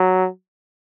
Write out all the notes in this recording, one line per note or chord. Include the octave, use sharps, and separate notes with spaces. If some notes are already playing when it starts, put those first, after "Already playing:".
Already playing: F#3